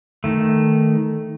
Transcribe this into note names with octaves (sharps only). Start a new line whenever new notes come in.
D#3 A3